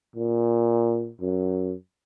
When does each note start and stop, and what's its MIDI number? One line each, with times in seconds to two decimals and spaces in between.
0.16 1.11 46
1.21 1.75 42